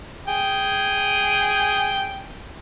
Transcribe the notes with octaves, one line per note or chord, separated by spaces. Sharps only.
G#4 G5